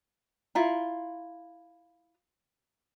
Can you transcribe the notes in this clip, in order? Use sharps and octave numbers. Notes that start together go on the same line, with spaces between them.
E4 F4 A#5